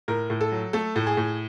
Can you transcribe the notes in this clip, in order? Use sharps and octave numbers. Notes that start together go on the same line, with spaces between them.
A2 A#4
A2
A4
F#3
A3 A4
A2
G#4
A2